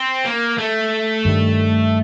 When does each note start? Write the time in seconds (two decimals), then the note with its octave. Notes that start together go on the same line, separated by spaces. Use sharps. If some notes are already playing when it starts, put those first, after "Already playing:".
Already playing: C4
0.26 A#3
0.59 A3
1.25 G2 D#3 G3